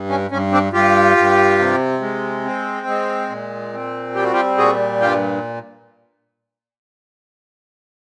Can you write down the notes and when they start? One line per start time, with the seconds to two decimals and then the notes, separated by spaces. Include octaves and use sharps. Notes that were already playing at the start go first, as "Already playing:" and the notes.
Already playing: G2
0.10 C#4
0.31 G2 C#4
0.52 C4 D4
0.73 G2 F4 G4
1.17 G2
1.59 C3
2.01 G#3
2.44 C4
2.87 G#3
3.29 A#2
3.73 C4
4.15 G3 G4
4.24 F#4
4.33 F4 G4
4.57 A#2 F#4 G#4
5.01 G2 F4 G4